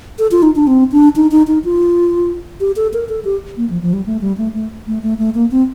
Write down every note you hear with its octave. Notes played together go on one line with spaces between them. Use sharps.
A4
F4
D#4
D4
C4
D4
D#4
D#4
D#4
F4
G4
A4
A#4
A4
G4
A#3
F3
F3
G3
A3
G3
A3
A3
A3
A3
A3
A#3
C4